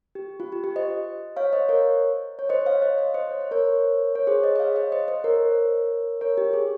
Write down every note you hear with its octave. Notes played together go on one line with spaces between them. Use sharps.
G4
F4
G4
G4
C5 D#5
C#5 F5
C5 D#5
A#4 C#5
C#5
C5 D#5
C#5 F5
C5 D#5
C5 D#5
C5 D#5
C#5
C5
A#4 C#5
C#5
G#4 C5
C5 D#5
D#5
C#5 F5
C5 D#5
C5 D#5
C5 D#5
A#4 C#5
A#4 C#5
G4
G#4